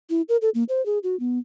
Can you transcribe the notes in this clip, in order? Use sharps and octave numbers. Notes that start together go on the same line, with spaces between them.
E4
A#4
A4
A#3
C5
G#4
F#4
B3